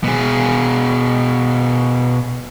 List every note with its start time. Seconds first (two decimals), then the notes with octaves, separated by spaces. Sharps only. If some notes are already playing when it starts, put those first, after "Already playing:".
0.04 B2 G#4